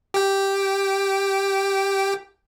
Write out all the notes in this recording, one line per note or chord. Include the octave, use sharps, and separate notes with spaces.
G4 G5